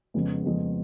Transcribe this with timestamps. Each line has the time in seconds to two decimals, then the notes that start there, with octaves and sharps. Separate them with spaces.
0.14 F2 C#3 G#3 B3
0.44 F2 C#3 G#3 B3